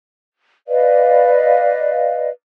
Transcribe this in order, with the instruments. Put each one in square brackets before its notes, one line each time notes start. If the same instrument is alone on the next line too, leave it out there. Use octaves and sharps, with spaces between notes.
[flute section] B4 D5 D#5 F5